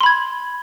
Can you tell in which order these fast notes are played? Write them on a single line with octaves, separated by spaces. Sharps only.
C6 B5 G#6